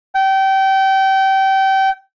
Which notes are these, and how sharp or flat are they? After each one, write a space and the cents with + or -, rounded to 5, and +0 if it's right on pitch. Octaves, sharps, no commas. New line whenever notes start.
G5 -25